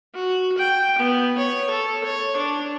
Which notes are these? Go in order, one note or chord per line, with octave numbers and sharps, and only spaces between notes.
F#4
G5
B3
C#5
A4
C#5
D4